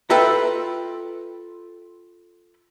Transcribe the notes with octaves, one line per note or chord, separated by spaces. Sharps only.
F4 A4 B4 E5 G5 A#5